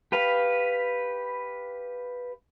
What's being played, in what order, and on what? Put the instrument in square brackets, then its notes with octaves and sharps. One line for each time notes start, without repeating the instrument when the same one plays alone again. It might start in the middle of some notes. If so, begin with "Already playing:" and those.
[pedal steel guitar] G4 B4 F5